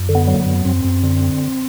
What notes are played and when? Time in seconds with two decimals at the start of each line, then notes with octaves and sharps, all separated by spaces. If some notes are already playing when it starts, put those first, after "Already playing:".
Already playing: F#2
0.09 D3
0.15 B3
0.27 F#3
0.35 A#3
0.40 B3
0.46 F#2
0.65 F#2 C4
0.85 F#2
1.03 D3